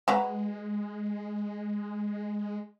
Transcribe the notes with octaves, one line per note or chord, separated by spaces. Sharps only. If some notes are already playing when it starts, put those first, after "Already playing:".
G#3 F#4 B4 A#5